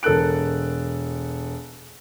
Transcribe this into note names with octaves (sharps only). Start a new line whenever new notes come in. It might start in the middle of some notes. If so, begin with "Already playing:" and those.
E1 A4 A#4 F#6 D7